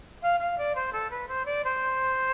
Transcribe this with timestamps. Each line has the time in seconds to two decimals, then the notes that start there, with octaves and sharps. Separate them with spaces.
0.22 F5
0.40 F5
0.58 D5
0.75 C5
0.93 A4
1.10 B4
1.28 C5
1.45 D5
1.64 C5